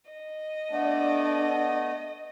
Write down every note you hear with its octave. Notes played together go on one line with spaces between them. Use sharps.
D#5
A3 B3 D4 D5